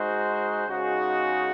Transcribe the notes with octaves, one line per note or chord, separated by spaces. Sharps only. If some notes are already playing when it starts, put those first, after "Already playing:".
Already playing: G#3 D#4 F#4 C5
C#3 G#3 D#4 F#4